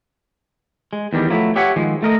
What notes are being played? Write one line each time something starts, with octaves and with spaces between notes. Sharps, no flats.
G#3
E2 D#3 G3
F3 F#3 A3 E4
G4 C#5 E5 F#5 G#5
D#3 F3 G#3
A3 A#4 D#5